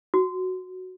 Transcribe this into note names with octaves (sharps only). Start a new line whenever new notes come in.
F#4